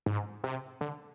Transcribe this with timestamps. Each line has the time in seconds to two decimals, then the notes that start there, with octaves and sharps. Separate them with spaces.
0.06 G#2
0.44 C3
0.81 D3